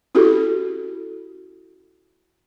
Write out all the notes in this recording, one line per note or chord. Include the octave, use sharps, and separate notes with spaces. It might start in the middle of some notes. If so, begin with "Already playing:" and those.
C#4 E4 F#4 G4 A4